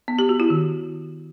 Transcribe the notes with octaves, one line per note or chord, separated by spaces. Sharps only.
B3
G4
F#4
E4
D#3